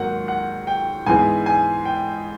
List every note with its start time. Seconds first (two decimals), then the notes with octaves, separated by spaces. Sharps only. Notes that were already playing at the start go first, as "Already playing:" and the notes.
Already playing: G#2 D#3 F#3 A#3 F#5
0.28 F#5
0.67 G5
1.06 G#2 E3 G#3 B3 G#5
1.46 G#5
1.85 G5